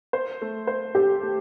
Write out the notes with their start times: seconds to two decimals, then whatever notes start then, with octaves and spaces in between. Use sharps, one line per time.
0.13 C5
0.41 A3
0.67 C5
0.95 G4 A4
1.22 A3